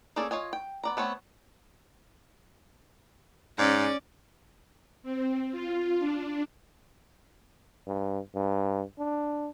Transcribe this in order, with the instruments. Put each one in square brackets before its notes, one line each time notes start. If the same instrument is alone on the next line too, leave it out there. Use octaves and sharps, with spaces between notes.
[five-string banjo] A#3 C#4 G#4 A4 D5
F4 C#5 D#5 G#5
G5
B3 D5 A#5
A3 B3 C4 C#5
[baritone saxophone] G#2 [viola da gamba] C#4 D5
[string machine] C4
F4
D4
[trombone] G2
G2
D4